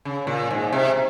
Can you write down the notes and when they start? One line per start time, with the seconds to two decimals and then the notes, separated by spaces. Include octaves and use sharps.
0.05 C#3
0.27 A#2
0.51 G#2
0.72 C3